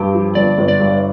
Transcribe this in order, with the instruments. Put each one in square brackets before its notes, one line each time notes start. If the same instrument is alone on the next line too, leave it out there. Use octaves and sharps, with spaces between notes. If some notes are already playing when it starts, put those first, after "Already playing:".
Already playing: [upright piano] G2 [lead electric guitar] G4
[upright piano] F3
[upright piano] G1 [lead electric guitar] D5
[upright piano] G1
[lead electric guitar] D5
[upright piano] G2